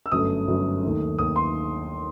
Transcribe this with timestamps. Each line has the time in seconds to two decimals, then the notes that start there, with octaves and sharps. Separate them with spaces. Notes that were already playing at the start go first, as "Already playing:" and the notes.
0.06 E6
0.12 G1 F#2 F#3 A3 D#6
0.47 G1 F#2 F#3 A3
0.83 D#2 D#3 A3
1.18 D#2 D#3 A3 D#6
1.36 C6